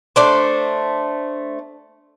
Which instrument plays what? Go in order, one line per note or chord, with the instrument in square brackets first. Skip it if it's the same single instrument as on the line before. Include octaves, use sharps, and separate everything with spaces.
[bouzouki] A3 D4 C5